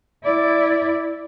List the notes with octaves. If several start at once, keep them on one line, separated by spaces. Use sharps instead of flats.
E4 D5